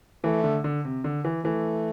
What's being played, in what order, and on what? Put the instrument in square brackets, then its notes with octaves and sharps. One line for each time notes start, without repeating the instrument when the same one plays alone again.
[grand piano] E3 [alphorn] A3
[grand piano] D3
D3
C3
D3
E3
[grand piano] E3 [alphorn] A3